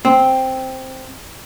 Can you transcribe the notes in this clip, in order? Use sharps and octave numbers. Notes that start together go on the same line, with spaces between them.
C4